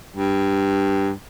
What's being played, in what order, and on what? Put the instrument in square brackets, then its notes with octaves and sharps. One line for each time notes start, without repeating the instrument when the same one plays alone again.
[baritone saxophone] G2